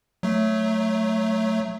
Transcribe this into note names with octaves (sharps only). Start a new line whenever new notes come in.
F#3 A3